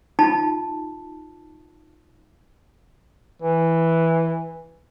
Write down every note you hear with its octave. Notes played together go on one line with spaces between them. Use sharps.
D#4 F4 A5 B5
E3